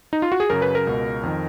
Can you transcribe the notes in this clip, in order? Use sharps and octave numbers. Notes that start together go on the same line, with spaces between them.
D#4
F4
F#4
G#4
F#2 C#3 A#4
B4
A#4
C#2 B2
F2 D#3